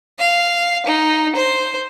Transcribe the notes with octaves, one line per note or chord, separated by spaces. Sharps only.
F5
D#4
C5